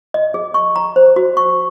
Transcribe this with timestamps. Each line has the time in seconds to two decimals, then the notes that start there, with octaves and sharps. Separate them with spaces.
0.14 D#5
0.34 G#4
0.54 C#6
0.76 A#5
0.96 C5
1.16 F#4
1.37 C#6